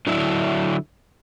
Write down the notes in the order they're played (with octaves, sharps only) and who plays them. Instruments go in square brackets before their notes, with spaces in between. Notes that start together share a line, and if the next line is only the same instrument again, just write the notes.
[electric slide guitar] D3 F#3 D4 E4